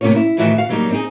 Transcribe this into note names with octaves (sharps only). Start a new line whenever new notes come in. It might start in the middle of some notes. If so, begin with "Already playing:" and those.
A2 C3 A#3 C#4 F4 C#5
E4
A2 D#3 E3 F#4 E5 G#5
F#4 F5
C#3 F#3 G3 A#3 D#4
C4 D#4 G#4